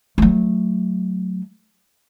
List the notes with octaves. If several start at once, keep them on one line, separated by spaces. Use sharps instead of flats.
F#3 A3